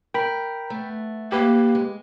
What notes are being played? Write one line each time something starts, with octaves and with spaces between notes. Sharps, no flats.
A#4 G5 B5
A3 B3
A#3 G4 B4
G#3